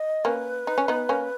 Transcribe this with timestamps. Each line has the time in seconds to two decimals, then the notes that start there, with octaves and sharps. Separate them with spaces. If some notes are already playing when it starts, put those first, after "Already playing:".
Already playing: D#5
0.25 A#3 C#4 B4
0.67 D#4
0.78 C#4
0.88 B3 D#4
1.09 A#3 C#4